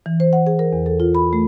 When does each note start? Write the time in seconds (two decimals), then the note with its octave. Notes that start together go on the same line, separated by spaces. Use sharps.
0.06 E3
0.20 C5
0.33 F#5
0.47 G#4
0.59 A#4
0.73 E2
0.86 A4
1.00 F4
1.15 B5
1.33 A3